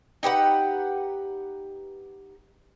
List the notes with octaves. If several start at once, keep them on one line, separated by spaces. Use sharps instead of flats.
D#4 G4 B4 F#5